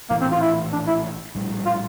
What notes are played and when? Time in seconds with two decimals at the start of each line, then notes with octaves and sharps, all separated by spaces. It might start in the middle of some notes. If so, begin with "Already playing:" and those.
0.10 A#1 A2 E3 A3 A#3
0.21 C4
0.31 F4
0.41 E4
0.73 D4
0.87 E4
1.35 A#1 A2 G3
1.66 F4